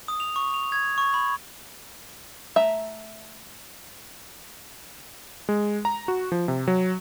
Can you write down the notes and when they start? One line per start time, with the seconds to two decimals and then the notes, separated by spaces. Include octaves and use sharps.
0.08 D#6
0.20 F7
0.36 C#6
0.54 F7
0.72 G#6
0.98 C#6
1.14 B5
2.56 A3 E5 A#5
5.49 G#3
5.85 A#5
6.08 F#4
6.32 F3
6.48 C3
6.68 F#3